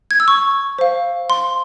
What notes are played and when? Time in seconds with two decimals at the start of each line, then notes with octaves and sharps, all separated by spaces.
0.11 G#6
0.20 E6
0.28 C#6
0.78 C5 F5
1.30 C6